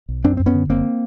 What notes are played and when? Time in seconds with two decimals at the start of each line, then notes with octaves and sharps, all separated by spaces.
0.09 B1
0.24 F#2 C4 D4
0.37 F#2 C4
0.46 B3 C#4
0.54 D3
0.69 F#1 A#3 C4